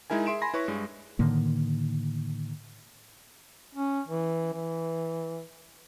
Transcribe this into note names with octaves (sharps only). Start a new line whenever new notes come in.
G#3 D#4 E4 A#4 G#5
G#4 E5 C6 D7 E7
G#5 B5 C6 A#6
E4 B4 C#5 C#6
G2 G#3
A2 D3 D#3 A#3
C#4
E3
E3